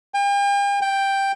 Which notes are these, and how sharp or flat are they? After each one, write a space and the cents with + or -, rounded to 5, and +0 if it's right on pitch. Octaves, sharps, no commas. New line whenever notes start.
G5 +45
G5 +5